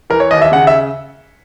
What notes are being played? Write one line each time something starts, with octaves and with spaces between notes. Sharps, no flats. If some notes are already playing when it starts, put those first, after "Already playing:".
E3 A#4
C#5
D#2 D#5
E5
C#3 F#5
E5